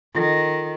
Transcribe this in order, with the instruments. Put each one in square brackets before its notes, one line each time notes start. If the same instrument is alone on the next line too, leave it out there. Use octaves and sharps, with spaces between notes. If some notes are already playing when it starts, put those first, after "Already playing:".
[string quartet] D#3 [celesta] F4 A4 D#5